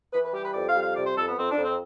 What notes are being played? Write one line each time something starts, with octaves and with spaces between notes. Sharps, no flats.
E3 B4
B4
G3 G4
B4
F2 D5
F5
G3
F5
C3 D5
C5
F2 A4
B3
F2 C4
D4
F2
C4